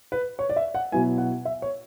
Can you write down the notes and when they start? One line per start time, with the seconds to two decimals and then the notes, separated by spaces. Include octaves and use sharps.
0.12 B4
0.39 C#5
0.50 D5
0.56 E5
0.74 F#5
0.92 B2 F#3 B3 E4 G#5
1.18 F#5
1.45 E5
1.62 C#5